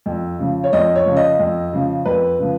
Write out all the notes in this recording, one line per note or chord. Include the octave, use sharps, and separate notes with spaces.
F2
C#3 F3
C#5
F2 D#5
C#5
C#3 F3
D#5
F2
C#3 F3
F2 B4
C#3 F3